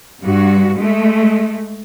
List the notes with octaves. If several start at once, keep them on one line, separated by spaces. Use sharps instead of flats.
G2 F#4
G#3 A3